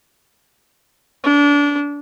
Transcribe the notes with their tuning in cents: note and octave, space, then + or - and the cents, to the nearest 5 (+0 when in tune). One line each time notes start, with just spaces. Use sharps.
D4 -25